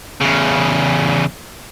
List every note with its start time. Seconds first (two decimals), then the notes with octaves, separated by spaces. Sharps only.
0.21 E2 C#3